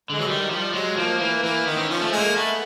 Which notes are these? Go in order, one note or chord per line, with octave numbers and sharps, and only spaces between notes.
D3 G#3
E3 F#3
D#3 G3
F3 G3
F#3 G#3
F3 A#3
E3 A#3
E3 A#3
D#3 B3
C4
C#4
F3
A3
G#3
A#3
A3 B3